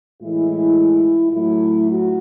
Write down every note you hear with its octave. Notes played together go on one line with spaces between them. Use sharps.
A2 E3 G#3 E4
A2 F#3 A3 E4
F#4